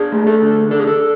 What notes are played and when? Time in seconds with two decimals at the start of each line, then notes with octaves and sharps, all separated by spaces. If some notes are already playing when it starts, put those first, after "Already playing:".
Already playing: D4 G#4
0.12 A3
0.27 A4
0.42 D3
0.71 D4 A4
0.79 G#4
0.87 A4